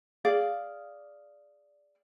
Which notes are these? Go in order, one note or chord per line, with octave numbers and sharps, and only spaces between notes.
G#4 D5 F5